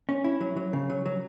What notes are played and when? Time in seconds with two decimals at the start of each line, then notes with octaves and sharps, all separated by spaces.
0.09 C#4
0.24 E4
0.41 F#3
0.57 F#3
0.73 C#3
0.90 F#3
1.06 F#3